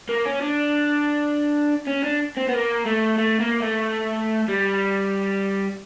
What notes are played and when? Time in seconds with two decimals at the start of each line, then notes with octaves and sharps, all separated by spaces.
0.09 A#3
0.25 C#4
0.42 D4
1.88 C#4
2.04 D4
2.37 C4
2.49 B3
2.53 A#3
2.86 A3
3.18 A3
3.40 A#3
3.62 A3
4.48 G3